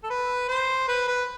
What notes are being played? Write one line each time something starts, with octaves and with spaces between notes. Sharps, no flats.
A4
B4
C5
B4
B4